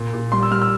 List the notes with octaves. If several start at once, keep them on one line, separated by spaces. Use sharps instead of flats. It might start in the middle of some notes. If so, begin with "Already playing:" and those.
Already playing: A#2
A#2
G3 C6
E6
G3 F6
E6